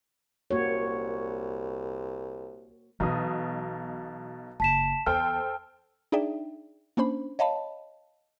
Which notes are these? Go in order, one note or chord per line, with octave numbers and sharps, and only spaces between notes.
C2 A#3 F#4 C#5
B1 B2 E3 E4 D#6
F#1 A5 B6 E7
E2 A4 C5 G5 F6
D4 D#4 G#4 D5 E5 G5
A#3 C#4 D4 C5 B5
C#5 D#5 F5 A5 B5